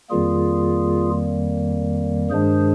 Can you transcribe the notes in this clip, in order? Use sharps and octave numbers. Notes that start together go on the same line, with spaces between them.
F2 D#3 G3 A#3 F4 G#4
G2 D#3 G#3 D4 G#4 C5